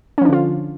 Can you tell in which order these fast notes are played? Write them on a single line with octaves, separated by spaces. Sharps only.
C#4 F3 D4 D3 F4